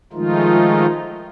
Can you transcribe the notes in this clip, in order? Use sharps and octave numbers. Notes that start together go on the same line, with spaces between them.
D#3 F3 G#3 A3 D#4 F4